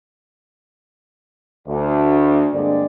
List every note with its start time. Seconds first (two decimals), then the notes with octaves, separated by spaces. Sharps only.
1.68 D2
2.53 G2 D3 G#3 A#3 C4 D5